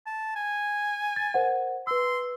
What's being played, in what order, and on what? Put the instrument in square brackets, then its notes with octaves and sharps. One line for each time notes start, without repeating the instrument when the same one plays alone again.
[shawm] A5
G#5
[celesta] A6
A#4 C5 F#5
[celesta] B4 E6 [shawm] C6